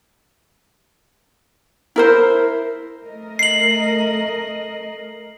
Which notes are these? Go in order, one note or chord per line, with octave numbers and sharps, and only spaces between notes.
E4 A#4 C5
A3 A#4 D#5
C7 F#7